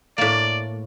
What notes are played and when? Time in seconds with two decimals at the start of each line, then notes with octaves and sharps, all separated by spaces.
0.18 A2 A#3 D5